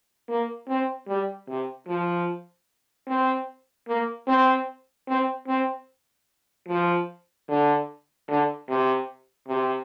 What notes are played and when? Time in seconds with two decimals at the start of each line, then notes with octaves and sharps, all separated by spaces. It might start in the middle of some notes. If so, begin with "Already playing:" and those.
0.29 A#3
0.69 C4
1.08 G3
1.48 C3
1.88 F3
3.08 C4
3.88 A#3
4.28 C4
5.08 C4
5.48 C4
6.69 F3
7.49 D3
8.28 D3
8.69 C3
9.48 C3